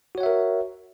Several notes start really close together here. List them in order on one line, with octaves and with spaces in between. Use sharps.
F#4 C#5 F#5 E5 A#4